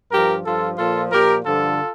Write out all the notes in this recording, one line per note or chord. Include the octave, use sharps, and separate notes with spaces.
G2 F3 G4 A#4
G2 F3 F4 A4
A#2 F3 F4 A4
A#2 F3 G4 A#4
G2 D3 F3 F4 A4